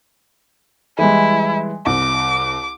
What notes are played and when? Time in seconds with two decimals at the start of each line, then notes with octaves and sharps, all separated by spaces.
0.99 E3 G3 G#3 E4
1.86 C2 D6